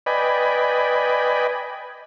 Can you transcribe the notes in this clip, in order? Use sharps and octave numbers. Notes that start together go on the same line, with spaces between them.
B4 D5 D#5 G5 G#5 B5